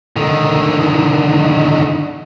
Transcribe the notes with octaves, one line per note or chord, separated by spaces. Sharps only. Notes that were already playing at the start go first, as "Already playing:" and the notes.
D3 D#3